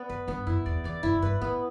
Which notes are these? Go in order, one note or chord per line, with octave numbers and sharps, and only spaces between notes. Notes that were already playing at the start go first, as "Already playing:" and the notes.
Already playing: B3 D5
F#2 B4
G2 B3
F#2 E4
E2 D5
E2 D5
F#2 E4
F#2
G2 B4
A2 B3